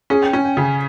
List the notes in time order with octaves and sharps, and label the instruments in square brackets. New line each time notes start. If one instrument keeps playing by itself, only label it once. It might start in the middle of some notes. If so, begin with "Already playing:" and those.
[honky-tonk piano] C#4 [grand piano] G#4
[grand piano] G5
[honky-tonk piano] C#4 [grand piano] G#5
[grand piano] G5
[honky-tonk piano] C#3 [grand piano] G#5